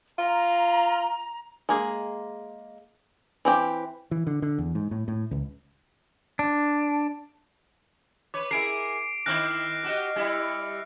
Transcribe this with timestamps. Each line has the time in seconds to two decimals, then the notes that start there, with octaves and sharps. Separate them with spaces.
0.18 F4 A#5
1.69 G#3 A#3 G#4
3.45 E3 C4 G4
4.11 E3
4.27 D3
4.42 D3
4.58 E2
4.75 G#2
4.91 A2
5.08 A2
5.31 C#2
6.39 D4
8.34 B4 C#5 D6
8.51 E4 G#4 A#4 C7 D7
9.26 D#3 C4 E4 F6 F#6 A#6
9.84 F#4 G4 D#5
10.16 G3 E4